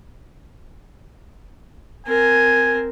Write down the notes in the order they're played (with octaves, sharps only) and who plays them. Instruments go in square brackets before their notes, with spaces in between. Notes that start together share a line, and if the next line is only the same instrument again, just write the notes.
[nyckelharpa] C4 A#4 [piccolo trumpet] G#5